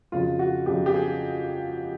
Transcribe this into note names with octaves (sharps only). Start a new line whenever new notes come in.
F2 C#3 F#3 F4
F#4
F2 C#3 F#3 G4
G4
G#4